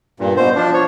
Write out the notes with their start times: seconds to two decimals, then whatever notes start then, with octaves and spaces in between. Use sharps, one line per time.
0.20 G2 A#2
0.37 B2 C5
0.56 F3 D4
0.74 C#5